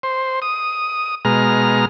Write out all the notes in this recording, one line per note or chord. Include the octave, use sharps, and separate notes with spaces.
C5
D#6
B2 G#3 A#5 F6